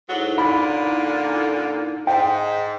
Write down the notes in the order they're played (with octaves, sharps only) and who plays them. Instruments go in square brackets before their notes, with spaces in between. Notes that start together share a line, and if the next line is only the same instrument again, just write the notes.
[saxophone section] G#2 F#3 [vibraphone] D#4 E4 A4
[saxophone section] A#2 D3 A#3 [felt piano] B5
[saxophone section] G#2 [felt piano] G5